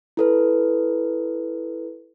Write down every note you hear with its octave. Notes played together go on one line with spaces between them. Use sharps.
E4 A4 B4